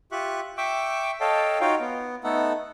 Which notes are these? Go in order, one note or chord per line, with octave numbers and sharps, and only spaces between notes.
F4 G4 E5 C#6 F#6
E5 G5 C#6 D6 E6
A4 C#5 D#5 F5 G5 A5
D#4 F4 F#4 C#5 F5 G5
B3
A3 B3 D#4 A4 F#5